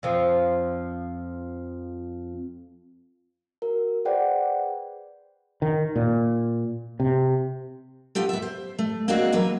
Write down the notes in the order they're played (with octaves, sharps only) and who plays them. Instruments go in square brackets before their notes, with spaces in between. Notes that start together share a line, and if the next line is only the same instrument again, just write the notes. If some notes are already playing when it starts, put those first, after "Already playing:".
[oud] F2 F3
[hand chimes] F#4 A#4
G#4 B4 C5 D5 F#5 G5
[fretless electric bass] D#3
A#2
C3
[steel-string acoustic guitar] B3 F4 G4 A4
B3 E5
C5
A3
A#3 C4 D4 D#4 F#4 G#4
E3 F#3 A#3 A#4 B4